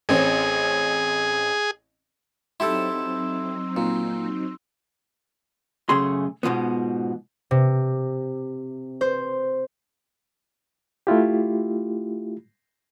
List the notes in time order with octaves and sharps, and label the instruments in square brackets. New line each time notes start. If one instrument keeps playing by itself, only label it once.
[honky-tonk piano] A1 C4 C#4 [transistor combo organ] G#4
[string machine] F#3 C4 D#4 [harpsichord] E4 G4 A4 [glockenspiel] C6 E6
[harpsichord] A#2
[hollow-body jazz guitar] F#2 C#3 A3 G#4 C6
G#2 B2 F3 B3
[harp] C3
C5
[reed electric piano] A3 E4 F4 G4